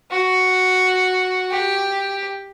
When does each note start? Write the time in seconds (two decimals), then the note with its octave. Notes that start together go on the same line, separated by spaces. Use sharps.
0.11 F#4
1.51 G4